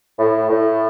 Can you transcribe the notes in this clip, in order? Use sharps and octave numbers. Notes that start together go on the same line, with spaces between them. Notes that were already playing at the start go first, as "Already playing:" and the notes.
A2
A2